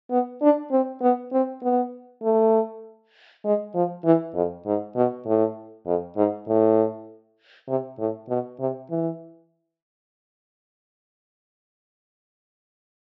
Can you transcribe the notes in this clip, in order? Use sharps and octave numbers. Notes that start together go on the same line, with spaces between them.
B3
D4
C4
B3
C4
B3
A3
G#3
F3
E3
F2
G#2
B2
A2
F2
G#2
A2
C3
A2
B2
C3
E3